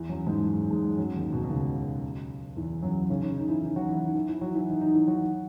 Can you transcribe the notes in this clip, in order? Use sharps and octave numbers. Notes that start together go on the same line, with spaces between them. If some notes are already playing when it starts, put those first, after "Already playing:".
Already playing: E2 E3
F#2 F#3
G#2 G#3
G#2 G#3
F#2 F#3
D#2 D#3
B2
B2
C#2 C#3
E2 E3
F#2 F#3
C#3 C#4
C#3 C#4
D#3 D#4
E3 E4
D#3 D#4
F#3 F#4
E3 E4
D#3 D#4
E3 E4
E3 E4
F#3 F#4
E3 E4
D#3 D#4
D#3 D#4
E3 E4
F#3 F#4